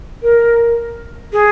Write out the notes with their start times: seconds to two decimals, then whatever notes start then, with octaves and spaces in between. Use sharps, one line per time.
0.22 A#4
1.33 G#4